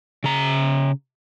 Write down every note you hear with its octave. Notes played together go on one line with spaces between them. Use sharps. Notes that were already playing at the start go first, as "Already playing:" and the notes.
C#3 A#5